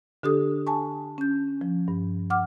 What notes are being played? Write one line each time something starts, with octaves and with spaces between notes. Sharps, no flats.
D3 D4 G4 A4 D#6
G#5 A5 C#6
C#4 G6
F3
G2
F#5 D6 F6